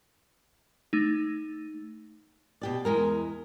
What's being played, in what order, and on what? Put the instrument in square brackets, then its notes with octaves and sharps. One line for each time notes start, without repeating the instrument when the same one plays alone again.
[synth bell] A3 D#4
[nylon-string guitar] B2 G4 D5
E2 G#3 A#4